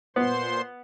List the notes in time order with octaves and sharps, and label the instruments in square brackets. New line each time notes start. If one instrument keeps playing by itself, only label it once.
[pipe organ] A#2 C5 C6 [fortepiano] B3